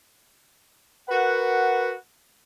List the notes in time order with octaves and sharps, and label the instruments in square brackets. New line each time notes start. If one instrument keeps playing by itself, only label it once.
[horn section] F#4 A#4 B4 F#5